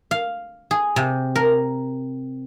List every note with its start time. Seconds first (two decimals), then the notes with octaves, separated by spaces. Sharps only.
0.11 F5
0.71 G#4
0.96 C3
1.36 A#4